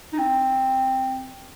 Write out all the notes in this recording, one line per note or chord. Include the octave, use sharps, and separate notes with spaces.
D#4
C4